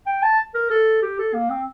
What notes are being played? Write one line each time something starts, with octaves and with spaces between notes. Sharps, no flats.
G5
A5
A#4
A4
G4
A4
A#3
C4